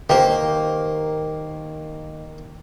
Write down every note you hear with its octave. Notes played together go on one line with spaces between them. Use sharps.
D#3 A#3 G4 A#4 C5